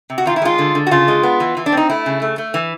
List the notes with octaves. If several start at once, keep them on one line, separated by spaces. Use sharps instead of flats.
C3
F#4
D#3 F4
E4
G#3 F4
D3
D3
F#4
C#3 F4
G#3
B3
E3
E3
D4
C4
D#4
A3 E4
C#3
A3
A3
E3